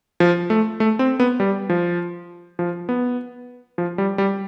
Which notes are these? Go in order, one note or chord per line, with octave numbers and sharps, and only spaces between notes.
F3
A3
A3
C4
B3
G3
F3
F3
B3
F3
G3
G3